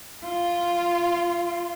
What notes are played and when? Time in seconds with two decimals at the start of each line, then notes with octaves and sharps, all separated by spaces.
0.24 F4